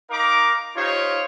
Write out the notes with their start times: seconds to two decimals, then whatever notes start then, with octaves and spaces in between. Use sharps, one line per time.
0.11 D#4 A#4 F5 A#5 D6
0.76 D#4 F4 G4 C5 C#5 F5